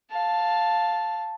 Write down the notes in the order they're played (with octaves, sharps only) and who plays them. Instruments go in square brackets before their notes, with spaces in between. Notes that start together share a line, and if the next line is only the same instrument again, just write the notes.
[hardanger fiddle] F5 A5